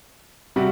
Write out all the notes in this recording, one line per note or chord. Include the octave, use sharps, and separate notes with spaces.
C3 G3 F#4